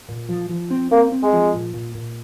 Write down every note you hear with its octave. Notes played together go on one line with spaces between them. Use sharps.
A#2
F3
F3
C4
A#3 C4
C4
G#3
F3
A#2
A#2
A#2